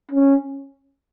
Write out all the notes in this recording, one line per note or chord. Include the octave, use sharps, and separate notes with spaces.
C#4